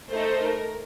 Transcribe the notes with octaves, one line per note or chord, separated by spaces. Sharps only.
A3 D#4 A4 C5
A#4